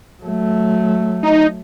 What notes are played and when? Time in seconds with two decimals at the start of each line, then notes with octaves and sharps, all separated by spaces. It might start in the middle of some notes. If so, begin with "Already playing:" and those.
0.23 F#3 A3
1.23 D#4